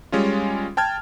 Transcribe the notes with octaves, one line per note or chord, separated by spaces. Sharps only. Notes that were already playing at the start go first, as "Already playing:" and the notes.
G3 G#3 C#4 F4
G5 A5 F6 G#6